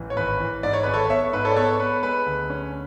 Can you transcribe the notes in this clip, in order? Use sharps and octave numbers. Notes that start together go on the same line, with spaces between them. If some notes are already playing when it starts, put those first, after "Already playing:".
Already playing: A1 E3
C#5
G#1 B4
E3
G#2 D5
C#5
G#1 B4
A4 C#5
B3 C#5 E5
G#2 B4
A4 C#5
D5
B3 A4 C#5
B3 B4
G#3 B4
D2
C#4